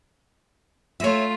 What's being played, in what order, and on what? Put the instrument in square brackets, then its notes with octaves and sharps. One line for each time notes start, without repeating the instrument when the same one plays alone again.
[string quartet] A3 F4 [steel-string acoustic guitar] C#5 E5